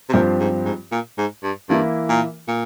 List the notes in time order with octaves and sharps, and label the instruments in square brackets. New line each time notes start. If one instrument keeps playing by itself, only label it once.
[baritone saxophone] C3
[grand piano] G2 F3 C4 G4 C5 [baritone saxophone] A#2
[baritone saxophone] G#2
G#2
A#2
G#2
G2
[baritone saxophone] G2 [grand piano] E3 A#3 E4
[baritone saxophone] A#2
A#2